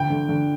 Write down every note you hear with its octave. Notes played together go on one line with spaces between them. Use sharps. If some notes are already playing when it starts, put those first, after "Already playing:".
Already playing: D2 G5
D3
D3